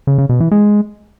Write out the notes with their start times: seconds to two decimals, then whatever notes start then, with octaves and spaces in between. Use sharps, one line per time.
0.07 C#3
0.18 C#3
0.29 B2
0.40 E3
0.51 G#3